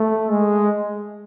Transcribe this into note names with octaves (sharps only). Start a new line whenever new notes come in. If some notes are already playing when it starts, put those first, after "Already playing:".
Already playing: A3
G#3